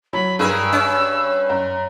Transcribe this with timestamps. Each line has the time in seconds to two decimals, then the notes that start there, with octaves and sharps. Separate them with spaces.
0.13 F#3 B5
0.39 G2 G#4 A#4 E6
0.72 C#4
1.49 F#2